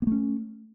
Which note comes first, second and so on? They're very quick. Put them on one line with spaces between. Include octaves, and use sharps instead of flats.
A#3 A3 C#4